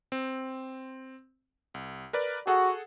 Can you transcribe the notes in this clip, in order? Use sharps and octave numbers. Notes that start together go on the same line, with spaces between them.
C4
C2
A#4 B4 D5
F#4 G#4 A4 F#5